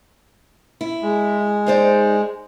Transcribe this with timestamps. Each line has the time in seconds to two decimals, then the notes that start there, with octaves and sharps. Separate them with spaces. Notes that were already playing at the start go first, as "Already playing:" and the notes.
0.81 E4
1.02 G#3
1.66 D#4 C5 D5